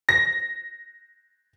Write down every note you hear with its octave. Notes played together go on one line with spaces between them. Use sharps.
A#6